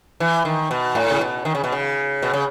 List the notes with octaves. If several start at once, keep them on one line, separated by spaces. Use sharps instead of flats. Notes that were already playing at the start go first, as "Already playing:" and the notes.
E3
D#3
B2
A2
C#3
B2
D#3
C#3
B2
C#3
B2
C#3